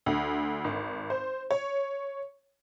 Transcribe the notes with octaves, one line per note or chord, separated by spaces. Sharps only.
D2
G#1
C5
C#5